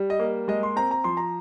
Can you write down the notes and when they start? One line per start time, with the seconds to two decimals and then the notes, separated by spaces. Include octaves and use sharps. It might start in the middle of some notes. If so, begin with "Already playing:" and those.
Already playing: G3
0.10 D#5
0.20 A#3
0.48 G#3 D#5
0.63 C6
0.76 C4 A#5
0.91 A#5
1.04 F3 C6
1.17 A#5